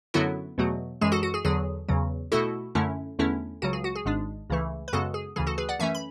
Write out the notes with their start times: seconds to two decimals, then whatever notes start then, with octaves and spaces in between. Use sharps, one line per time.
0.14 F#2 D3 F#3 B3 E4 F#4 A4
0.58 E2 B2 F#3 A3
1.01 F#2 E3 G#3 G#4
1.12 F#4 A4
1.23 F#4
1.34 G#4
1.45 E2 D3 F#3 G#4
1.89 E2 C#3 F#3
2.32 B2 A3 E4 F#4 A4
2.75 F#2 D3 A3 C#4 E4
3.19 E2 D3 A3 C#4 E4
3.62 C#2 C#3 F#3 F#4
3.73 G#4
3.84 F#4
3.95 G#4
4.06 G#1 G#2 G#3 D4
4.50 C#2 C#3 E3 A3
4.88 B4
4.93 F#2 C#3 G#3 B3 F#4 A4
5.14 G#4
5.36 D2 C#3 E3 G#4
5.47 F#4 A4
5.58 G#4 B4
5.69 D5 F#5
5.79 F#2 E3 A3 C#4 E5 G#5
5.95 B5